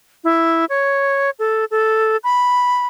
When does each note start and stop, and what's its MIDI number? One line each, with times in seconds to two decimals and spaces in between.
0.24 0.65 64
0.69 1.30 73
1.39 1.65 69
1.71 2.17 69
2.24 2.87 83